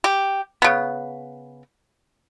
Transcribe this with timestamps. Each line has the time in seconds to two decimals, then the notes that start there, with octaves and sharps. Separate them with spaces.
0.04 G4
0.62 C#3 B3